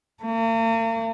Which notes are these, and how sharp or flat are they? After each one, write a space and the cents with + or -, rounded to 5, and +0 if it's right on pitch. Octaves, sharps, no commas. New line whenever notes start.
A#3 -45